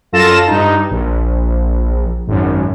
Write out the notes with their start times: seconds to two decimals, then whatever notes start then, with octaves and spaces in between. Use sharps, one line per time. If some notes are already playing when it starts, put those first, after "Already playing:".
0.12 F#2 F4 A4 A5 A#6 E7
0.47 G2 D#4
0.90 A#1
2.27 G#1 F#2